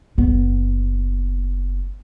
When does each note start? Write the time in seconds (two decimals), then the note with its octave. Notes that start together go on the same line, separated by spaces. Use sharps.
0.18 F#1 B3